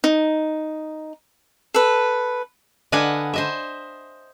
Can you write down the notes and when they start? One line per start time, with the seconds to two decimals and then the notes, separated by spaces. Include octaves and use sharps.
0.04 D#4
1.74 A4 B4
2.92 D3 B4 D#5 F5 F#5 G#5
3.34 C5 D#5 E5